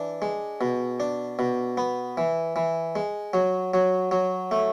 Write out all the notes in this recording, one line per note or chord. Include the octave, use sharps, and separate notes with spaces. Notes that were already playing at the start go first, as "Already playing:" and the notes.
Already playing: E3 D4
G#3
B2
D4
B2
B3
E3
E3
G#3
F#3
F#3
F#3
A3